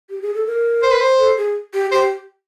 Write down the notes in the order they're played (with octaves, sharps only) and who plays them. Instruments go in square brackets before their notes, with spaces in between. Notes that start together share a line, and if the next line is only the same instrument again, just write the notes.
[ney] G4
G#4
A4
A#4
[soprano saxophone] C5
B4
C5
[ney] A4
G#4
G4
[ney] G4 [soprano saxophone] C5